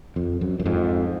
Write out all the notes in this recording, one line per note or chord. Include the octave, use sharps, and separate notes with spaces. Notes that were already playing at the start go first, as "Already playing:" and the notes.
F2
F#2
F#2
F2 G#2